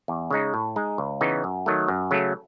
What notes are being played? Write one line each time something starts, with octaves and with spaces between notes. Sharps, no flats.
E2
C#3 G#3 D#4
A2
G#3 D#4 G#4
C#2
C#3 E3 B3 D#4
F#2
D#3 F#3 A3
F#2
C#3 F#3 A3